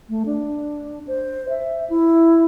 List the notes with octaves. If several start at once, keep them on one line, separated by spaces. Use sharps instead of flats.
A3
D4
C5
E5
E4